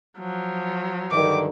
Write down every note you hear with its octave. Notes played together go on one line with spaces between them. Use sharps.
F3 F#3
G2 D3 D#3 D6